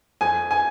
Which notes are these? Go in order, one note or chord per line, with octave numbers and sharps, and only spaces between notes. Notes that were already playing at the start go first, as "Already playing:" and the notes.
F2 G#5
G#5